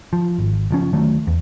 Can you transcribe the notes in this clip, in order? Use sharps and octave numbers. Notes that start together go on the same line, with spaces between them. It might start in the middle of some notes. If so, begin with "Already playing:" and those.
F3
G#1
F#1 F3 C#4
D2 D#3 F#3 A3
E2